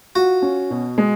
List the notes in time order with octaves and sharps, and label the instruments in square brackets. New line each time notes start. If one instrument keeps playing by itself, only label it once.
[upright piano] F4 [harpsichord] F#4
[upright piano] C#4
B2
G#3